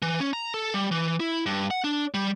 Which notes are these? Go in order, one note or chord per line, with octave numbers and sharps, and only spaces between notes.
E3
C#4
A#5
A4
G3
E3
E4
G2
F#5
D4
G3